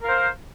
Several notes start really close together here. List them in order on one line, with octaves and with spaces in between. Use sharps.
A#4 F5 C5